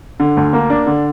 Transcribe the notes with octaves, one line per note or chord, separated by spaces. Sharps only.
D3
D2
A#3
D4
D3